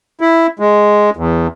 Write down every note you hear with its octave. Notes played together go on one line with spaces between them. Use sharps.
E4
G#3
E2